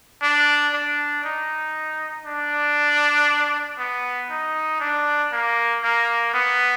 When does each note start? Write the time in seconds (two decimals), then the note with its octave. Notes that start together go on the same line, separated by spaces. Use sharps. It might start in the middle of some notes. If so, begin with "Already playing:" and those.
0.22 D4
0.73 D4
1.24 D#4
2.26 D4
3.78 B3
4.30 D#4
4.80 D4
5.32 A#3
5.83 A#3
6.34 B3